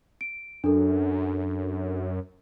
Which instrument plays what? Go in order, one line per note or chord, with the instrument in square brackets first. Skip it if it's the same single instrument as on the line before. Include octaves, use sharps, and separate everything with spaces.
[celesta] D7
[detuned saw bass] F#2 [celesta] D4 A4